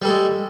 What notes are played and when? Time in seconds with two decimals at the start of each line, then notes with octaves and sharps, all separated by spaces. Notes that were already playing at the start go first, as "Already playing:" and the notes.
0.02 G3
0.05 A4
0.08 G#3